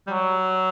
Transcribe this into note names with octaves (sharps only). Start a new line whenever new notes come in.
G3
F#3